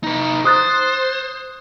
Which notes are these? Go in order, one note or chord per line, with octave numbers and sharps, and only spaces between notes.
D#4 B4
C5 D#6 F#6 A6